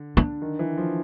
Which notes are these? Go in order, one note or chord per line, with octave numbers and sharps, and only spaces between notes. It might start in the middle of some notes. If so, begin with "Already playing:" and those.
Already playing: D3
D4
D#3
E3
F3